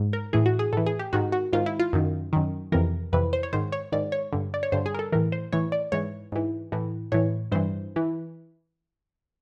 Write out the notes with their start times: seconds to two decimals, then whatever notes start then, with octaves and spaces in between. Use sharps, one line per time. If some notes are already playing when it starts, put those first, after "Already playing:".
Already playing: G#2
0.13 A#4
0.33 A2 E3 G#4
0.46 F#4
0.59 G#4
0.73 A2 E3 A4
0.87 G#4
0.99 G4
1.13 G#2 D#3 F#4
1.32 F#4
1.53 G#2 D#3 F4
1.66 E4
1.79 F4
1.93 F#2 D#3
2.33 F#2 D#3
2.72 F2 C3 E3 A#4
3.13 F2 C3 E3 B4
3.33 C5
3.43 C#5
3.53 G#2 D#3 C5
3.72 C#5
3.92 G#2 D#3 D5
4.12 C#5
4.33 G2 D3
4.54 D5
4.63 C#5
4.72 G2 D3 C5
4.86 G#4
4.94 A#4
4.99 A4
5.12 A2 E3 A#4
5.32 C5
5.52 A2 E3 C#5
5.72 D5
5.92 G#2 E3 C#5
6.32 G#2 E3
6.72 A2 E3
7.12 A2 E3 C#5
7.52 G2 E3 C5
7.96 E3